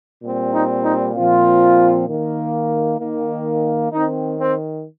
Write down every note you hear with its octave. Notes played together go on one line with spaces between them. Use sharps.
A#2 G3 C4
D#4
D#4
A#2 F3 C4 F4
D#3 A#3
D#3 A#3
D#3 C4 D#4
C4